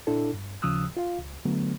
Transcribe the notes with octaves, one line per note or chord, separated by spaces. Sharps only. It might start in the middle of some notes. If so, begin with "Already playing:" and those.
A#2 D4 E4 A4
G2
D#2 C#3 F3 D#6 E6 F#6
F4 F5
C#2
D3 F#3 A3 B3